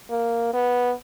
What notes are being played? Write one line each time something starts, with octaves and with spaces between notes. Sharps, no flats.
A#3
B3